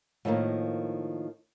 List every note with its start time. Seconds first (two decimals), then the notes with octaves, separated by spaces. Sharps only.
0.25 A2 D#3 F3 A3 A#3